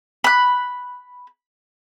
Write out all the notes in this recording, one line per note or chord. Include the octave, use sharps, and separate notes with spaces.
B5 F#6